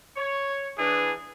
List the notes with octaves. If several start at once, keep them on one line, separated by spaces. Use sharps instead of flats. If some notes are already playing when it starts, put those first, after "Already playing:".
C#5
E3 D4 G#4